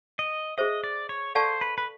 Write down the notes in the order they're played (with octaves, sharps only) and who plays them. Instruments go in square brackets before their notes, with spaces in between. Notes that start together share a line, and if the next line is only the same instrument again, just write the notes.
[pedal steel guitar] D#5
[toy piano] G#4 C5 E5 [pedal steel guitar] D#5
[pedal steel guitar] D5
C#5
[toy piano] A4 D5 F5 A5 C#6 [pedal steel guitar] C5
[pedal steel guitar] B4
B4